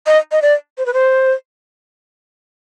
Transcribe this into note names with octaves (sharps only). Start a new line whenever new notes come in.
D#5
D#5
D5
C5
B4
C5